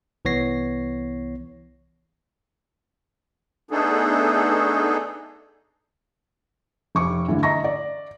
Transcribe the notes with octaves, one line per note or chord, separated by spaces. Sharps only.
C2 E3 B3 C#5 A#6 C7
A3 B3 D4 D#4 G#4 A4
F1 C#6 D6
G2 D3 E3
D#5 E5 A#5 C#6 A#6
D5